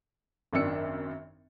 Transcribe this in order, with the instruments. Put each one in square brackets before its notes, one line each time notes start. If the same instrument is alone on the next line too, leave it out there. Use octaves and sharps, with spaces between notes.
[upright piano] G#1 F#2 D#3 D4 E6 C#7